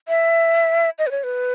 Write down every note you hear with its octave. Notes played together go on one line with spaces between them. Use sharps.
E5
D#5
B4
C#5
B4